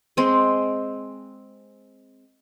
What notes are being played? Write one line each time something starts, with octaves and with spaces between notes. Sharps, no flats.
G#3 C4